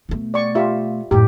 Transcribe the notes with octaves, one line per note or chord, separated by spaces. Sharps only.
B2 A3
D5 C#6
F4 G4 E5
F#2 A2 G4